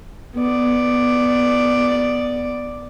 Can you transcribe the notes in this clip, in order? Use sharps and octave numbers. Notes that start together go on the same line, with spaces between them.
B3 D5